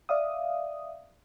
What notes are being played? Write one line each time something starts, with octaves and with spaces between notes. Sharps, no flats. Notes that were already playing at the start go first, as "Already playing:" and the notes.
D5 E5 F5 D#6